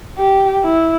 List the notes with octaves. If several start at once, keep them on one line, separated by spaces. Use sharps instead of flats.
G4
E4